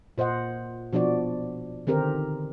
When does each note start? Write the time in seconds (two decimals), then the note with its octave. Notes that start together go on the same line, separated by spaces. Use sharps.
0.18 A#2 C5 D#5 F#5
0.93 B2 F3 D4 F#4 D5
1.87 D3 D#3 C4 G4 A#4